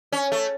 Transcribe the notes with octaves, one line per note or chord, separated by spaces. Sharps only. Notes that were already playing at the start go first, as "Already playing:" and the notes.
C#4
A3